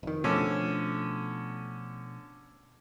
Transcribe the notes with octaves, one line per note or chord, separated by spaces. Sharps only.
F1 D#3
B2 D3 F3 A3 C#4